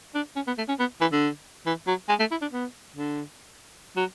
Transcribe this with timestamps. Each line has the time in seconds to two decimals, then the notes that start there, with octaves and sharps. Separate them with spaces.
0.15 D4
0.36 C#4
0.47 B3
0.58 A3
0.68 C#4
0.79 B3
1.01 E3
1.12 D3
1.66 E3
1.87 F#3
2.09 G#3
2.20 A3
2.31 E4
2.41 D4
2.52 B3
2.95 D3
3.96 F#3